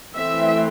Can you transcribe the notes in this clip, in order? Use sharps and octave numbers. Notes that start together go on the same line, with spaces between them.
E3 A3 C4 E5